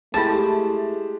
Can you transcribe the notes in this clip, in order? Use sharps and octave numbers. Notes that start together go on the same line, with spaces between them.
G#3 A3 E4 G4 A5 A6